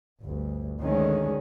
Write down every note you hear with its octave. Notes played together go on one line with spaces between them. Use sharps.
G1 D2
D2 D3 D#3 G#3 C#4